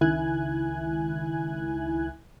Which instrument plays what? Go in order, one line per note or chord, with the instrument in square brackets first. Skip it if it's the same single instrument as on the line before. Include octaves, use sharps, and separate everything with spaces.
[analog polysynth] C#2 D#3 E4 G#5 F#6 G#6